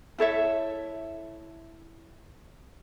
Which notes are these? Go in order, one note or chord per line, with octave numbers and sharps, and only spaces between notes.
E4 A4 C#5 E5